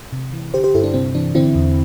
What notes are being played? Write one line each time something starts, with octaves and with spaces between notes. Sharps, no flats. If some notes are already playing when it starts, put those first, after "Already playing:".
C3
E3
D3 G4 C5
G4 C5
G2 E4 A4
D4
C3 C4
E3 D4
D3 C4 E4
E2